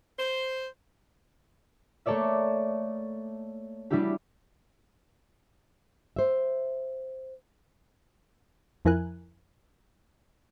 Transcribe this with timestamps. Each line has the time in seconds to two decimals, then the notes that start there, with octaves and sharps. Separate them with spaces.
0.19 C5
2.06 A3 A#3 A4 C#5 D5 E5
3.90 G3 D4 E4 F#4 G4
6.16 C5 E5
8.85 F2 F3 E4 A#4 G#5 F#6